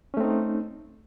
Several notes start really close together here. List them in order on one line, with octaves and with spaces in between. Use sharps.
C#4 A3 C4 D#4